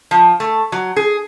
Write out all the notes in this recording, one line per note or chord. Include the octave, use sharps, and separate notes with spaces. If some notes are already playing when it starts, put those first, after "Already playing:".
F3
A3
F#3
G#4